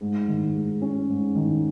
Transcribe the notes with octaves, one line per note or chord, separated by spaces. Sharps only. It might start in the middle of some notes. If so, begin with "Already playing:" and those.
G#2
D#3
G#3
C#4
G#2
D#3